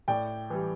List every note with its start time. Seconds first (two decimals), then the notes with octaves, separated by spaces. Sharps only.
0.08 A2 D5 G5
0.50 E3 G3